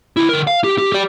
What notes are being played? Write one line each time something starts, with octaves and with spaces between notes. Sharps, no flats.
D2 E4
D3 A#4
F5
G4
G4
G4 D5